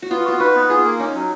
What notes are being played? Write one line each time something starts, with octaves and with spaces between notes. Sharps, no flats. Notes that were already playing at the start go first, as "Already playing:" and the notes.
F#4
B3 F4
F4 F#4
D#4 B4
B3
F4 G#4
A#3
C#4 D#4
F#3